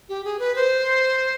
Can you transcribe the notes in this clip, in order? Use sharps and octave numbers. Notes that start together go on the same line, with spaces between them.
G4
G#4
B4
C5